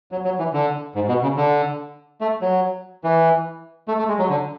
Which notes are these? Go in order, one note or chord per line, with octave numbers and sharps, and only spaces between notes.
F#3
F#3
E3
D3
G#2
B2
C#3
D3
A3
F#3
E3
A3
A3
G#3
F#3
D3